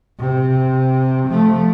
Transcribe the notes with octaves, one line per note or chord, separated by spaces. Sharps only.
C3
F3 A3